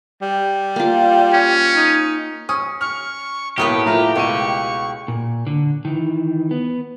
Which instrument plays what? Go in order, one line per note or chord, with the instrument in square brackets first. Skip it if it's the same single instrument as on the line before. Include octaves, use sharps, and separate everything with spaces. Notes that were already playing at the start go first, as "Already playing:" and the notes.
[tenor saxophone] G3
[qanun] A#3 F4
[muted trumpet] C#4
[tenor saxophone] D#4
[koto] C#4 [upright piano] D#6
[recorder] C#6 [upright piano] F6
[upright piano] E1 A#3 D#6 [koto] A2 B3 B4 [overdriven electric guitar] G4 [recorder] C#6
[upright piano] A3 A#3 F4 [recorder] A#5
[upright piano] C#2 D#7 [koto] B2 [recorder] C#6
[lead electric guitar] A#2
D3
D#3 E3
B3